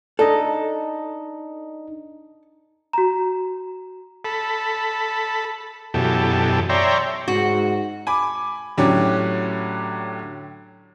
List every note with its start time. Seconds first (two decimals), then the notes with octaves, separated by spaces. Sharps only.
0.19 D4 D#4 A4 D#5
2.93 F#4 A#5
4.25 A4 B5
5.94 F#2 B2 E3 G4 A4
6.70 C#5 D5 E5 G5 A#5 C6
7.28 G#2 F#4
8.07 G#5 B5 D6
8.78 A2 D3 F#3 C#4 G4